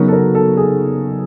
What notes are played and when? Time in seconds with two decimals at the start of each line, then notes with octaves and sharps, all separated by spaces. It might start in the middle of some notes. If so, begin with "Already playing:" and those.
Already playing: C#3 F#3 B3 D#4 F#4 A#4
0.08 A4
0.13 A#4
0.35 A4
0.57 G#4